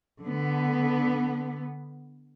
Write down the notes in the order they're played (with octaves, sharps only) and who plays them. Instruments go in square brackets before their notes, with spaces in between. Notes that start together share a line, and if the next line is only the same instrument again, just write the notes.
[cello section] D3 B3